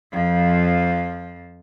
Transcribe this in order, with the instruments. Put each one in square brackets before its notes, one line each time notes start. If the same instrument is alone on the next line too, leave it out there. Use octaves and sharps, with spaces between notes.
[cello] F2 F3